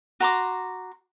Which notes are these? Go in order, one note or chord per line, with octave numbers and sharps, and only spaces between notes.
F#4 A#5 C6 D6